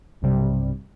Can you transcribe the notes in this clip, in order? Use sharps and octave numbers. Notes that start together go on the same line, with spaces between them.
B1 G2 C3 G3